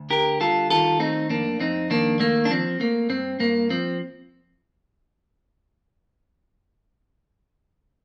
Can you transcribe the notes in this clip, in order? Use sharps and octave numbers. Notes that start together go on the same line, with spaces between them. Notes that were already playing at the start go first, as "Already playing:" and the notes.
Already playing: D2
D3 G4 A#4
G3 F4 A4
D#3 F4 A4
A3 C4 D#4
F2 A#3 D4
F2 C4 D#4
D#3 A#3 D4
A3 A#3
D4
F3 C4
A3 A#3
G2 C4
G2 A#3
F3 C4